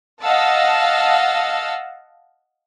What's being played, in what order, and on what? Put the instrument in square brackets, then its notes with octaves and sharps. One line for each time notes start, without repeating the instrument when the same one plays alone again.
[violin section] D#5 F5 F#5 A5 E6